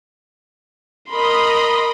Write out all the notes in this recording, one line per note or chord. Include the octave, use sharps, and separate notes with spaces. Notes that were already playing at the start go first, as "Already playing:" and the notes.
A#4 D#5 B5 C6